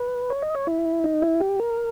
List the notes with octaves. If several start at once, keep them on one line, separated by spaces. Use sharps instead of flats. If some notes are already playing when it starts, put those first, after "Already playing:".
Already playing: B4
C#5
D#5
C#5
E4
D#4
E4
G4
A#4